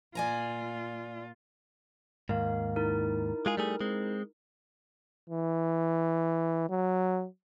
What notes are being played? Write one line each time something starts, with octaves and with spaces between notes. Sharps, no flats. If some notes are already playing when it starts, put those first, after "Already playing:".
A#2 F4 D5 G#5 A#5
D#2 G#2 A#4 F5
D#4 E4 A#4
G#3 F4 G#4
G3 A3 G#4
G#3 C4
E3
F#3